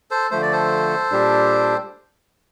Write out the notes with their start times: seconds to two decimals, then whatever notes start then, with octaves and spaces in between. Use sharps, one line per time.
0.11 A4 C5
0.31 D3 F3 A3 C5
0.42 D5
0.52 A4 C5
1.11 A#2 G3 D4 G4